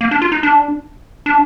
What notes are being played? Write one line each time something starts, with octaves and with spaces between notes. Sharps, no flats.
A#3
D4
F4
D#4
D4
D4